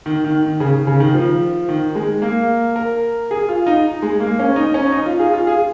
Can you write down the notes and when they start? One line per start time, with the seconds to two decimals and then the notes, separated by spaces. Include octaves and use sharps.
0.06 D#3
0.25 D#3
0.43 D#3
0.60 C#3
0.87 C#3
1.00 D#3
1.14 F3
1.69 D#3
1.95 G#3
2.22 A#3
2.76 A#4
3.31 G#4
3.49 F4
3.67 D#4
4.02 G#3
4.20 A#3
4.39 C#4
4.56 D#4
4.74 C#4
4.92 D#4
5.06 F4
5.20 G#4
5.33 F4
5.47 G#4